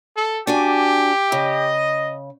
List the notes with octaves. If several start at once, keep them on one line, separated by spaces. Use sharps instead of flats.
A4
D4 F#4 G4 G#5
C#3 D#5